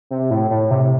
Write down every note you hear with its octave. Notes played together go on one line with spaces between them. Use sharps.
C3
A2
A2
C3